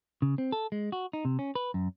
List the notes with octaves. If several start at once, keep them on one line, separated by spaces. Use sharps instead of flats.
C#3
C4
A4
G#3
F#4
D#4
C3
C#4
B4
F#2